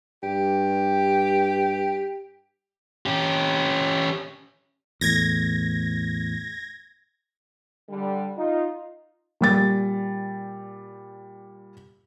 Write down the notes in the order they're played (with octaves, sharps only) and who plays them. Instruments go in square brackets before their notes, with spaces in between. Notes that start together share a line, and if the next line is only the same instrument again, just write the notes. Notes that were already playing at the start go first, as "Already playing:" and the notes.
[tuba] G2 [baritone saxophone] G4
[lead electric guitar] C#4 G4
[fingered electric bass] E2 A2 [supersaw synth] G#6 A#6
[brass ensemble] D3 G3
D#4 F4
[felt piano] A#2 G3 A6